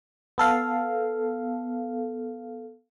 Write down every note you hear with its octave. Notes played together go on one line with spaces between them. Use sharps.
B3 A4 F5